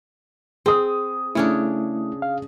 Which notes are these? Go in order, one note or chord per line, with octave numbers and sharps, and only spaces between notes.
C4 G#4 D#6
C#3 A3 C#4 D4 E4
F5